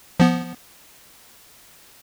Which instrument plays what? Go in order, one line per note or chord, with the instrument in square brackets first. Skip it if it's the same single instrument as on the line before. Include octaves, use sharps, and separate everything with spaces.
[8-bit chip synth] F3 B3